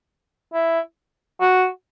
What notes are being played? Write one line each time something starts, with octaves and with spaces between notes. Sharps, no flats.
E4
F#4